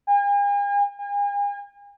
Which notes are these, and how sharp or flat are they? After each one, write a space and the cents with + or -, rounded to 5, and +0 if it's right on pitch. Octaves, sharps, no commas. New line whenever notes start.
G#5 -45
G#5 -40